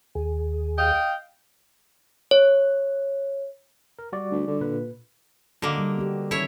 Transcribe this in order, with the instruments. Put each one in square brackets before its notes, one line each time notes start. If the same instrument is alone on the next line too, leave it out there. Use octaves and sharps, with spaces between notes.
[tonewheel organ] D#2 G#4
[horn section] D#5 F5 G5
[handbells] C#5
[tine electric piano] A#4
G3 F#4 D5
[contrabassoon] D2
D3
[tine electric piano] A#2 B4
[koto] D3 A#3 [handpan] F#4 D#5
[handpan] G3
B3 F#4 G4
[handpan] D#3 C#4 A4 [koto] E4 C#5